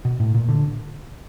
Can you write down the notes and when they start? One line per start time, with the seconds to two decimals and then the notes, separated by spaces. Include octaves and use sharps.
0.05 B2
0.20 A2
0.34 A#2
0.49 D3